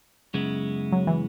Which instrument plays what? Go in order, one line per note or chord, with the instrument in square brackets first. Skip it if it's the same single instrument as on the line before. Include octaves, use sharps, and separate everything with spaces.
[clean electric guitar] F#2 C#3 G#3 B3 E4
[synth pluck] F#3
E3